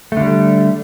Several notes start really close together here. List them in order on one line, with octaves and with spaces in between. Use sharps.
A3 D3 G3